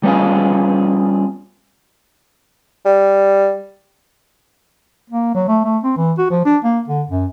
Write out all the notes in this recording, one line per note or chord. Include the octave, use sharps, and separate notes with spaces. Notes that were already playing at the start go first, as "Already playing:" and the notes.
G3 B3 C#4 F4 G#4
G3
A#3
F#3
A3
A3
C4
E3
F#4
F3
D4
A#3
D3
F#2